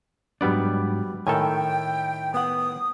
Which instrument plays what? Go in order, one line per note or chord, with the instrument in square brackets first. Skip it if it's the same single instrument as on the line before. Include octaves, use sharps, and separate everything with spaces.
[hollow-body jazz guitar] G#2 F#3 D4 [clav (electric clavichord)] G3 B3 D5
[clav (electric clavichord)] A2 D#3 A4 [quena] G5 [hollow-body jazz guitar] G#5
[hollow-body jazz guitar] B3 F#5 [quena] D#6